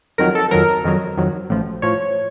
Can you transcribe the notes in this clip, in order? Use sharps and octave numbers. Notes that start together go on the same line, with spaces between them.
F2 D#3 F#3 A#4
A4
F2 D#3 F#3 A#4
F2 D#3 F#3
F2 D#3 F#3
A1 A2 F3
A2 F3 C#5